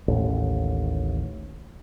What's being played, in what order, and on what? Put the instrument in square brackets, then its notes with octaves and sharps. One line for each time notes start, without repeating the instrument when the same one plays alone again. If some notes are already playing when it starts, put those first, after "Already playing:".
[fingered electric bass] A1 D#2 A2